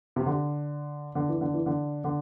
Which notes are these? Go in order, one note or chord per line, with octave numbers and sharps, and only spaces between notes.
C3
D3
D3
E3
D3
E3
D3
D3